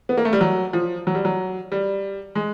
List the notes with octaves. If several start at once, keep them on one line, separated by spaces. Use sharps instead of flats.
B3
A#3
A3
G3
F#3
F3
F#3
G3
F#3
G3
G#3